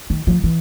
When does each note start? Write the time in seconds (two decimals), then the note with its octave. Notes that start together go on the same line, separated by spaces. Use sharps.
0.10 D#3
0.27 F3
0.44 E3